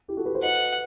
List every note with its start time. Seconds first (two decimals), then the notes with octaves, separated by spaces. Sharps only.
0.08 E4 G4
0.17 F#4 A4
0.26 G4 B4
0.34 A4 C5
0.43 B4 D#5 F#5